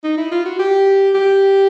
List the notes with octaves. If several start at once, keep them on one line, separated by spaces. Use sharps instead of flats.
D#4
E4
F4
F#4
G4
G4